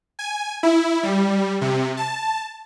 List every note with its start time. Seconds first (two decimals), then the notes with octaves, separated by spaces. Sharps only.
0.19 G#5
0.63 E4
1.03 G3
1.61 C3
1.97 A5